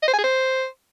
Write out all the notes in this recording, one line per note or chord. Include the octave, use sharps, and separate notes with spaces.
D#5
C5
G#5
G#4
C5